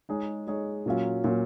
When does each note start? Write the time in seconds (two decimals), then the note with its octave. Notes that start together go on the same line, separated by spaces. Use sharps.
0.09 G#3 D#4 G#4 C#5
0.47 G#3 D#4 G#4 C#5
0.86 A#2 F#3 C#4 F4
1.24 A#2 F#3 C#4 F4